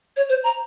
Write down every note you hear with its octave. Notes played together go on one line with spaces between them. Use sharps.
C#5
C5
A#5